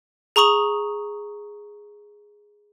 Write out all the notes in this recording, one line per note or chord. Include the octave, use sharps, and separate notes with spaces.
G#4 A#5 C#6 D#6 F#7